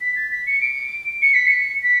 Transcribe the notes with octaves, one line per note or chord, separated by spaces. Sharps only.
B6
A6
B6
C#7
D7
C#7
B6
C#7
B6